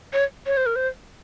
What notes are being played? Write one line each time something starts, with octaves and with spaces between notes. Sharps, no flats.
C#5
C#5
C5
A#4
C5